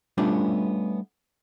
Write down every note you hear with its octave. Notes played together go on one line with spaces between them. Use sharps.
G3 A3 B3 C#4 D4 F4